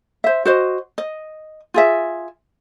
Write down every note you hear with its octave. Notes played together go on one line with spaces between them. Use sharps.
C5 E5
F#4 C5 D#5
D#5
F4 G#4 E5